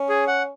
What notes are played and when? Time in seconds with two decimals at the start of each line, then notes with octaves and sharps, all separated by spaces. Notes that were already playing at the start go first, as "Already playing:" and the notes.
Already playing: C#4
0.09 G#4
0.28 F#5